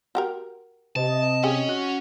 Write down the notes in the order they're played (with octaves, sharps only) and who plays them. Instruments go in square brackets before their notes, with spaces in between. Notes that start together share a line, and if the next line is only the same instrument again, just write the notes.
[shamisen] F#4 G4 A#4
[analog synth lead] C3 [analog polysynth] D#5 [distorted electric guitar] A5
[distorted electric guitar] C#4 [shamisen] G4 G#4
[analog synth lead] F#4